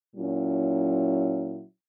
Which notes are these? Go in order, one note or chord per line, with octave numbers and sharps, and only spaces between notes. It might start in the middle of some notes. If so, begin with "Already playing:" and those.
A#2 F#3 C#4 E4